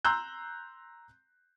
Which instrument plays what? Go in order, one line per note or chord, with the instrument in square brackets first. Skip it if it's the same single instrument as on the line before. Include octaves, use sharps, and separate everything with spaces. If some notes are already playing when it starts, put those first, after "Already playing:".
[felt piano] A#5 C6 E6 F#6 G6